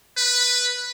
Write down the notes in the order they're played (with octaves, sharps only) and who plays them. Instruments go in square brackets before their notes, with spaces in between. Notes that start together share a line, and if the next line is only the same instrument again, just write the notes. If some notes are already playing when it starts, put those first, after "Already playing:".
[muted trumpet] B4